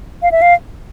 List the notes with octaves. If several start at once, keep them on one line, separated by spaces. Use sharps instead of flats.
F5
E5
F5